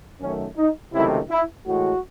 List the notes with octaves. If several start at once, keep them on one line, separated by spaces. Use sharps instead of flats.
F#2 D#3 F#3 A3 C#4
D#4
C#2 C3 D#3 F#3 A3 E4
E4
A2 E3 G#3 F#4